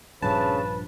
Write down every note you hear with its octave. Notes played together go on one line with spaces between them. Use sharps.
A#1 G2 C#3 F3 B4 A5